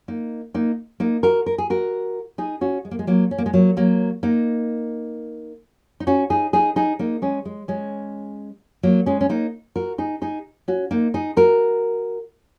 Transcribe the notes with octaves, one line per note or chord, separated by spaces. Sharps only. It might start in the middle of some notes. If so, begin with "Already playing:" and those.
A#3 D#4
A#3 D#4
A#3 D#4
F#4 A#4
A#4
G#4
F#4 A#4
D#4 G#4
C#4 F#4
G#3
A#3
G#3
F#3 A#3
C#4
A#3
G#3
F#3 A#3
F#3 A#3
A#3 D#4
D#4
C#4 F#4
D#4 G#4
D#4 G#4
D#4 G#4
A#3 D#4
G#3 C#4
G#3
G#3 C#4
F#3 A#3
G#3 C#4
C#4
A#3 D#4
F#4 A#4
D#4 G#4
D#4 G#4
C#4 F#4
A#3 D#4
D#4 G#4
F#4 A#4